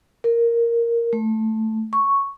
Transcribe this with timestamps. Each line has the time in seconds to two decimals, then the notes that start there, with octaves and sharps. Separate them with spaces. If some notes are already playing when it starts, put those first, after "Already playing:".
0.24 A#4
1.13 A3
1.93 C#6